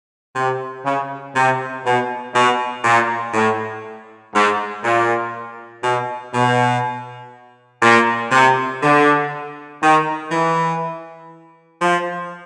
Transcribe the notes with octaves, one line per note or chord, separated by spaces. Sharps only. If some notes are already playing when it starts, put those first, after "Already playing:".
C3
C#3
C3
B2
B2
A#2
A2
G#2
A#2
B2
B2
A#2
C3
D3
D#3
E3
F3